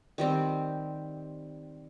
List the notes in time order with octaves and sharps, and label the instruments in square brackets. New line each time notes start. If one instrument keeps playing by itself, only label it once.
[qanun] D#3 G3 C4